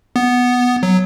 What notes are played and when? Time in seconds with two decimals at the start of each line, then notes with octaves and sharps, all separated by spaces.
0.16 B3
0.83 F#3